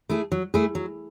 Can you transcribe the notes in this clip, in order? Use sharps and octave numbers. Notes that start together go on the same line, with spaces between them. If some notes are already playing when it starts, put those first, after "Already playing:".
A3 E4 G#4
F#3
A3 E4 G#4
F#3